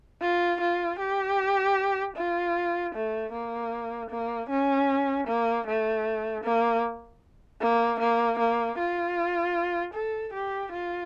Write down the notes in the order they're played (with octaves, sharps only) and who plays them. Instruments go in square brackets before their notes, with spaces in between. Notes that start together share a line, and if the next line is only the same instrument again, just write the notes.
[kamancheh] F4
F4
G4
F4
A3
A#3
A#3
C#4
A#3
A3
A#3
A#3
A#3
A#3
F4
A4
G4
F4